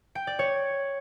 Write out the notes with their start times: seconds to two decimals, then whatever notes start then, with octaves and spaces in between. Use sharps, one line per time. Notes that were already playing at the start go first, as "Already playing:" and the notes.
0.15 G5
0.27 D5
0.39 C#5